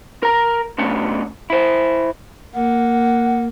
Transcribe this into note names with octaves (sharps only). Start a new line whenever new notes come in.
A#4 A#5
B2 A3 C#4 D4
E4 C5
A#3 F#5